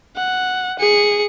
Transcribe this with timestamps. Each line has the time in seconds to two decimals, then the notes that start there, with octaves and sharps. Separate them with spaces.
0.17 F#5
0.79 G#4 C#7